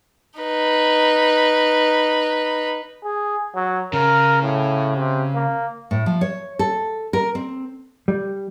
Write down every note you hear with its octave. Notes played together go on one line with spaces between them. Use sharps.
D#4 B4
G#4
F#3
C#3 A#4
A2
C3
A#3
A2
F3
C#5
A4
A#4
C4
G3